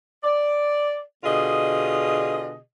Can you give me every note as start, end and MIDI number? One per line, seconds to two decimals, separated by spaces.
0.24 1.00 74
1.24 2.57 47
1.24 2.57 50
1.24 2.57 65
1.24 2.57 68
1.24 2.57 75